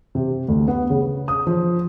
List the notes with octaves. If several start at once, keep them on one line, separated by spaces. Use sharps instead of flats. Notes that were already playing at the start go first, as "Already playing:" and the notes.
C3
D2
B3
C#3
D#6
F3